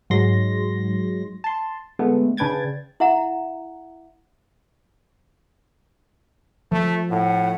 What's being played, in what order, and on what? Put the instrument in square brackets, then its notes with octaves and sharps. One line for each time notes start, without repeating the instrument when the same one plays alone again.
[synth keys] G#2 F#3 G#3 C6 A#6
A5 C6
D3 G#3 A3 B3
C#3 D4 B4 G5 G#6 A6
[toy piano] E4 E5 F#5 A#5
[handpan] F3 [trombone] A3
[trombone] A2 [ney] F#5